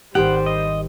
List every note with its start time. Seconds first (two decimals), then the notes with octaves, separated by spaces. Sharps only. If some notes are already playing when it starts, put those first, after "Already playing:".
0.15 G#1 D#3 G3 G4 C5 F#5
0.46 D#5